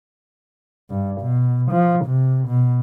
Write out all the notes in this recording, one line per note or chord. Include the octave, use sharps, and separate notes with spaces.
G2
B2
F3
C3
B2